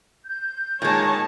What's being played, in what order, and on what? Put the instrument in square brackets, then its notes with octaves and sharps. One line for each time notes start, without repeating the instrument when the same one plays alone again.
[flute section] G6
[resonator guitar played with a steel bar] A#2 G#3 [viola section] D#3 C#5 A5